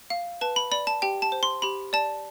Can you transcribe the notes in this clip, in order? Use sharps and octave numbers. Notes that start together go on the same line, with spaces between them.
F5
B4 A5
B5
D5 B5
A5
G4 G5
A5
C5
C6
G4 B5
D5 A5